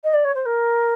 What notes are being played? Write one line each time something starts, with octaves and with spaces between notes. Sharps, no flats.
D#5
D5
C#5
C5
A#4